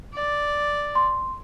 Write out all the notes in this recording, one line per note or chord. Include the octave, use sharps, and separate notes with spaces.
D5
C6